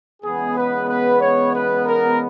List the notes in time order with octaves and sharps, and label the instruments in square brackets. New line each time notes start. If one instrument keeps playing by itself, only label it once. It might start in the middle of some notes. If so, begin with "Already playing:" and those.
[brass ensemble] E2 C#3 G#3 B3 [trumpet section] G#4
[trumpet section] B4
B4
C#5
B4
A#4